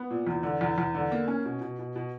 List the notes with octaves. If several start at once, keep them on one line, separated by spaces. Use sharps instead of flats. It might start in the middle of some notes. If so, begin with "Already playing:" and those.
Already playing: B3
A#2
E2
D3
E2
E2
D3
A#3
C#4
B2
B2
B2
B2